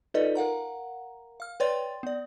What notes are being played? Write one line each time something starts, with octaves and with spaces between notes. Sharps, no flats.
D#4 F4 A4 B4 D5 D#5
A#4 F5 F#5 A#5
F5 F6
B4 C#5 D5 G5 C6 A6
B3 D5